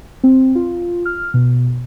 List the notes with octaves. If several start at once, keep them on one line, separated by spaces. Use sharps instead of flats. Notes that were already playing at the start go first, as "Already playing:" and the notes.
C4
F4
F6
B2